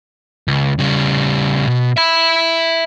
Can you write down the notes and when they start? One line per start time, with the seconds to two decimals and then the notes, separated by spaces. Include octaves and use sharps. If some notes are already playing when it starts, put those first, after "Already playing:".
0.48 C#2
0.79 C#3 G3
1.67 B2
1.97 E5 B5